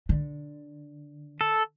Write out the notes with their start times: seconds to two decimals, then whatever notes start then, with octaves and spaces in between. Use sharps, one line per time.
0.09 D3
1.41 A4